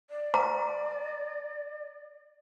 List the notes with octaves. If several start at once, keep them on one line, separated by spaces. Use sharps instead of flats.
D5
A#5